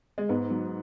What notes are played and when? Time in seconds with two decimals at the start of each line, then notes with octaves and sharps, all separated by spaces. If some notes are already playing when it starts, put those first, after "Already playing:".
0.18 G#3
0.29 G#2 B3
0.50 F#3